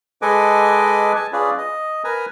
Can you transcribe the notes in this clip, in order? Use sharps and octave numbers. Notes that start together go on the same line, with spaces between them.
G#3 A4 B4 D#5 G#5 D6
G#5 A5
C#4 F4 G#4 B4 D5
D#5
A#4 B4 G#5 A#5